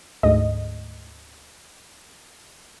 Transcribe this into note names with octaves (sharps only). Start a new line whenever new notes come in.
D2 G#2 D#5